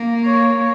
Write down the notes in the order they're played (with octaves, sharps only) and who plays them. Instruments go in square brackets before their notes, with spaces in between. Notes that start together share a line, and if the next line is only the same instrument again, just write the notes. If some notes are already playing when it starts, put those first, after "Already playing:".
Already playing: [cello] A#3
[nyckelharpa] C#5